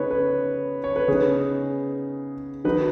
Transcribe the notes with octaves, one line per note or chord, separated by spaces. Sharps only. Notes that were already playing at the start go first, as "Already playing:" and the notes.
Already playing: C#3 B3 D#4 B4 C#5
B4
C#5
B4
C#3 B3 D#4 G#4
D#3 F#3 D#4 B4